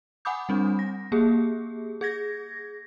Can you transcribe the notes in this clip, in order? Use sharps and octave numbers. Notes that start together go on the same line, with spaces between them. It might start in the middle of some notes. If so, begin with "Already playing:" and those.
F#5 G#5 B5 D6 D#6 G6
G3 C4 D4
A#6
A#3 G4 G#4
G#4 G#6 A#6